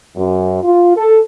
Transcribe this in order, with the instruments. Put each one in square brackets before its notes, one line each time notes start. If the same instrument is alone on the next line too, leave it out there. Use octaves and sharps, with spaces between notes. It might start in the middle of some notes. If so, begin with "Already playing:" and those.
[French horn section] F#2
F4
A4